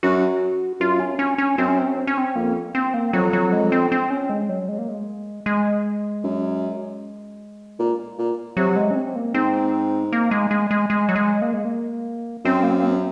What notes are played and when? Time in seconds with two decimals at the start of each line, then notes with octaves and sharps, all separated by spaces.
0.03 F#2 F#4
0.80 F#2 F4
1.00 C#4
1.19 C#4
1.38 C#4
1.58 F#2 C4
1.68 C#4
1.78 C4
1.88 C#4
1.98 C4
2.07 C#4
2.18 C4
2.36 F2 A#3
2.75 C4
2.94 A#3
3.13 F2 F#3
3.33 F#3
3.53 G#3
3.72 C4
3.92 C4
4.10 C#4
4.30 G#3
4.49 F#3
4.69 G#3
4.78 A#3
4.88 G#3
5.46 G#3
6.24 F#2
7.79 A#2
8.18 A#2
8.57 C3 F#3
8.76 G#3
8.91 C#4
8.96 C4
9.16 A#3
9.34 G#2 C4
10.13 A#3
10.31 G#3
10.51 G#3
10.71 G#3
10.90 G#3
11.09 F#3
11.16 G#3
11.42 A#3
11.54 G#3
11.65 A#3
12.45 F#2 C4
12.63 A#3
12.71 C4
12.83 A#3
12.89 C4